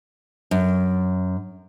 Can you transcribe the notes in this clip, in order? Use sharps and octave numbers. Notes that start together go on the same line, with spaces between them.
F#2